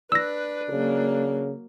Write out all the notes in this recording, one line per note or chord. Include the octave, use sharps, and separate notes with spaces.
D4 B4 E6 A#6
C#3 F#3 A#3